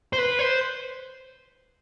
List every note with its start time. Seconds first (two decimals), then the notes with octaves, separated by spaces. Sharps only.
0.13 C5
0.18 B4
0.39 C5